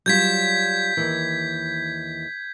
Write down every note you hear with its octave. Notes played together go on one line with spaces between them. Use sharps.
F#3 G3 F4 G6 G#6 B6
D#2 E3